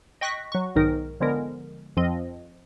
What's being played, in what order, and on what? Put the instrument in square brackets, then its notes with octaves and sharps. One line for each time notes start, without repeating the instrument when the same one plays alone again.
[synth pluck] D#5 G5 C#6 F#6 A#6 B6
F#3 C#6
B1 G#2 D#3 D#4 A#4
D3 F3 G#3 B3 A#4
F2 F3 C4 D#5